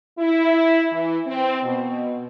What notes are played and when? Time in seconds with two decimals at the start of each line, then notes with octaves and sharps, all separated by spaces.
0.18 E4
0.92 E3
1.27 C4
1.63 B2